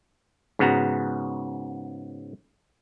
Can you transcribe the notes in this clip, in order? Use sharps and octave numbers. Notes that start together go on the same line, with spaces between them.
G#2 C#3 B3 F#4 A#5